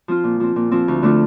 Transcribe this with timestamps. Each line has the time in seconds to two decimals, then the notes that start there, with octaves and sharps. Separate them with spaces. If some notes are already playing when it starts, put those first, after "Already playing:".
0.08 F3 C4 F4
0.24 A#2
0.40 F3 C4
0.56 A#2
0.72 F3 C4
0.88 D2
1.02 D3 A3 D4 F4